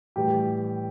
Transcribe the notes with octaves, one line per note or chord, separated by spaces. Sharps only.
A2 E3 G3 G4